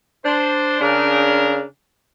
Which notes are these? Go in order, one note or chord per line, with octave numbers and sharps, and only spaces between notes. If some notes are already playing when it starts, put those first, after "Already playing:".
D4 C5
C#3 D4 A#4